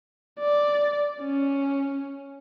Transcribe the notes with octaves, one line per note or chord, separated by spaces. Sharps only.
D5
C#4